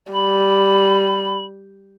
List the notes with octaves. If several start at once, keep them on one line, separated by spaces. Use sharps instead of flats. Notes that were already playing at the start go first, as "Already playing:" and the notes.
G3 B5